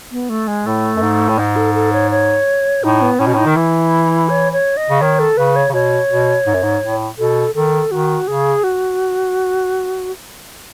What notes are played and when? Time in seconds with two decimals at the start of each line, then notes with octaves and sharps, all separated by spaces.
0.12 B3
0.29 A3
0.47 G#3
0.66 A2 A3
0.96 F#2
1.02 G#2
1.29 A2
1.38 G#2 D#4
1.56 A4
1.75 A4
1.93 C#5
2.11 C#5
2.84 A2 D#4
3.01 B3
3.19 A2 C#4
3.27 B2
3.34 A2 D#4
3.45 D#3
3.56 E3 E4
4.29 C#5
4.53 C#5
4.77 D#5
4.90 C#3
5.01 D#3 C#5
5.19 A4
5.37 C#3 B4
5.56 C#5
5.69 C#3
5.73 B2 C#5
6.10 B2
6.46 G#2
6.54 F#2
6.63 G#2
6.82 A2
7.19 B2 A4
7.55 D#3 A4
7.91 D#3 F#4
8.28 C#3 G#4
8.64 F#4